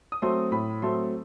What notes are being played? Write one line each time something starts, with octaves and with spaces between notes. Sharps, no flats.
D#6
F#3 A3 C4 C6
A2 B5
F#3 A3 C4 C6